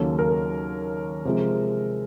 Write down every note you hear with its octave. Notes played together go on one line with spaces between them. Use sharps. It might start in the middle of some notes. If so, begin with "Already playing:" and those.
Already playing: D#2 C#3 F#3 A#3 C#4 A4
A#4
C3 F3 G#3